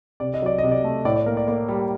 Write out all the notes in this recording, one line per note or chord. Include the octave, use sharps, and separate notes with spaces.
C3 D5
D#5
F#3 D5
C3 D#5
D5
A3
A2 D5
D5
A#3 A#4
D5
A#3 D5
G3